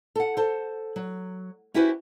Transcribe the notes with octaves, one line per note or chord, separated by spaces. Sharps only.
A4 F#5
A4 C5
F#3
C#4 E4 F#4 G4 B4 C5